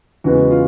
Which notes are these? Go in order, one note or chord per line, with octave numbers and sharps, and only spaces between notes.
E2 C#3 E3 G#3 B3 F#4
F4